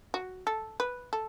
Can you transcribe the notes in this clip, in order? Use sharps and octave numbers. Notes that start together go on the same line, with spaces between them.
F#4
A4
B4
A4